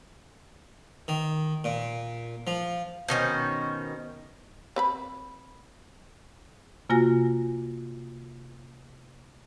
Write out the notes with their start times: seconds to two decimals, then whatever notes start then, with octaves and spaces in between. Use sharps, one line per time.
1.08 D#3
1.64 A#2
2.47 F3
3.08 B2 D#3 C#4 C5
4.76 C4 B4 B5
6.90 C3 A#3 F4 F#4 G#5 A#6